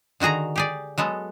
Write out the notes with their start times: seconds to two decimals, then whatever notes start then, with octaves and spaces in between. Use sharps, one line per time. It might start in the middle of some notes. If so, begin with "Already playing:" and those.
0.20 D3 D#3 F#4 G#4 A#5
0.56 G4 G#4 D5
0.98 F#3 G#3 B3 A4